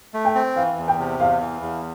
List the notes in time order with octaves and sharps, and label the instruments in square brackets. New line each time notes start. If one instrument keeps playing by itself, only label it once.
[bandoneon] A3
[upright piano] G5
[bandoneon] C4
[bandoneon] E3 [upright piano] F5
[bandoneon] E2
[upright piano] G5
[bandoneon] C3
[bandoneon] E2 [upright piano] F5
[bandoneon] E3
E2